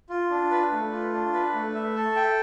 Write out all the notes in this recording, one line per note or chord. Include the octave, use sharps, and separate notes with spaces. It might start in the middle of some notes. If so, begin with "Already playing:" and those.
F4
D4
B4
A3
F4
D4
B4
A3
E5
A4
G5